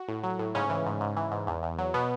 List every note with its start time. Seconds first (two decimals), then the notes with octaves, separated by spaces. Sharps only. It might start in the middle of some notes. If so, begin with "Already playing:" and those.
Already playing: F#4
0.08 A2
0.24 F#3
0.39 A2
0.55 G#2 C#3 C#4
0.70 E3
0.86 G#2
1.01 G#2
1.16 E3
1.32 G#2
1.47 E2
1.63 E2
1.78 F#3
1.94 B2 B3